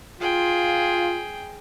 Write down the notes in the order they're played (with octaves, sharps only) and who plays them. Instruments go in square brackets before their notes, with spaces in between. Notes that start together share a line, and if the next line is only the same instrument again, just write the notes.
[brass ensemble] F4 [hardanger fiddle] G#4 G5